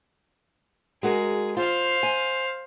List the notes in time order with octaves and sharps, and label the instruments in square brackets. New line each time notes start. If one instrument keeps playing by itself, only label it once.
[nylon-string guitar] G#3 F#4 A#4 [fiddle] G#4
[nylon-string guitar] F4 [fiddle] C5 F5
[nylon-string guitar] G#5